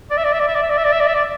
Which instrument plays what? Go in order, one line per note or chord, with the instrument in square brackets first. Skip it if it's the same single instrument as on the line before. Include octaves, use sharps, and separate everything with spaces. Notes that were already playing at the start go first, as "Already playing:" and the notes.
[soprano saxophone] D5
E5
D5
E5
D5
E5
D5
E5
D5
E5
D5
E5
D5
E5
D5